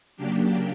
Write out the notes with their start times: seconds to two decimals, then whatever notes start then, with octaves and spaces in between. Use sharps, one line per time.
0.17 C#3 F#3 A#3 D4 G4